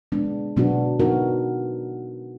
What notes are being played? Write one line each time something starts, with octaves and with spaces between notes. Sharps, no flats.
G#3 B3 D4
B2 F#3 B3 D4 F#4
F#3 B3 D#4 F#4 A#4